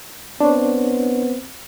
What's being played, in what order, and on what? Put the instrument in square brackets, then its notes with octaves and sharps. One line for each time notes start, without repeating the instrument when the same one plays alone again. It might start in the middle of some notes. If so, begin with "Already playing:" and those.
[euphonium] B3 [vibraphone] C4 C5 [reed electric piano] D4 C#5